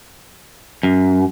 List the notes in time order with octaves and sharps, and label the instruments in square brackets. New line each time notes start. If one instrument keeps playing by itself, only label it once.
[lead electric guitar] F#2